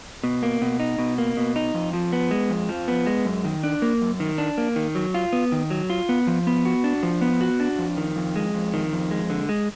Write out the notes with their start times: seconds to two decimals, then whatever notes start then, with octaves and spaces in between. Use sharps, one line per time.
0.24 B2
0.43 A#3
0.62 B2
0.80 D#4
0.99 B2
1.18 A#3
1.37 B2
1.56 D#4
1.74 F2
1.93 F3
2.13 B3
2.31 G#3
2.50 F2
2.69 F3
2.88 B3
3.07 G#3
3.25 F#2
3.45 D#3
3.63 D4
3.82 A#3
4.01 F#2
4.20 D#3
4.38 D4
4.58 A#3
4.76 D#3
4.95 F#3
5.14 F4
5.33 B3
5.52 D#3
5.71 F#3
5.90 F4
6.09 B3
6.27 F3
6.47 B3
6.65 F#4
6.84 D4
7.03 F3
7.21 B3
7.41 F#4
7.60 D4
7.79 F2
7.97 D#3
8.16 F2
8.36 G#3
8.55 F2
8.74 D#3
8.93 F2
9.11 G#3
9.30 D3
9.49 G#3